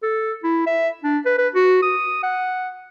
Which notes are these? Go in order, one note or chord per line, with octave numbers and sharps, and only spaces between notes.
A4
E4
E5
D4
B4
B4
F#4
D#6
F#5